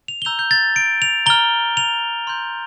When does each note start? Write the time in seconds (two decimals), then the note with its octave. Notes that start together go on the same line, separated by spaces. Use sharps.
0.08 F7
0.22 G7
0.25 A#5 E6 G6 F7
0.39 G6
0.51 A6
0.76 D7
1.02 F7
1.26 A#5 F6 G7
1.77 F7
2.27 C6 G6